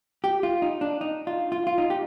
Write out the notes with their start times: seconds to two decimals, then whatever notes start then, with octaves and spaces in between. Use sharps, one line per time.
0.24 G4
0.43 F4
0.62 D#4
0.81 D4
1.01 D#4
1.27 F4
1.52 F4
1.67 F4
1.78 D#4
1.90 G4